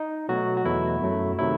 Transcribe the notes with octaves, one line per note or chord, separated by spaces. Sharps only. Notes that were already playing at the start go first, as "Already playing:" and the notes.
Already playing: D#4
B2 F#3 A3 F#4
F#4
E2 B2 F#3 A3 E4
F#2 F#3 A3
C3 D#3 F#3 A3 E4